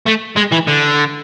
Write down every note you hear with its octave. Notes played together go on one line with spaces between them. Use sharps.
A3
G#3
E3
D3